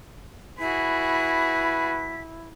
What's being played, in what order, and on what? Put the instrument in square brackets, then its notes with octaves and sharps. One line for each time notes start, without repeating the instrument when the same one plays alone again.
[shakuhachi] E4 [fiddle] F#4 G#4 [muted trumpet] B4 [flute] B6